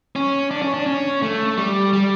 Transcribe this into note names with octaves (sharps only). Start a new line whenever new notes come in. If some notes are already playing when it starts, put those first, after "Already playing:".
C#4
D4
C#4
D4
C#4
A3
G3
G3